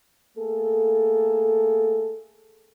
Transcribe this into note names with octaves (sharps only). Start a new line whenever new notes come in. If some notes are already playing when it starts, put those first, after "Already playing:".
A3 A#3 G#4 A4